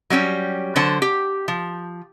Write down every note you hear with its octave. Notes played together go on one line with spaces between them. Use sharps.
F#3 G3 C#4 G4
D3 F#3 C5 A5
G4
F3